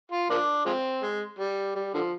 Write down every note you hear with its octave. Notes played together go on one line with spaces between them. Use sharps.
F4
F3 A#3 D4
F3 G#3 C4
G#3
G3
G3
D3 F3